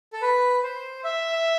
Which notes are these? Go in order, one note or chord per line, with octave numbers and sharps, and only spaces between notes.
A4
B4
C5
E5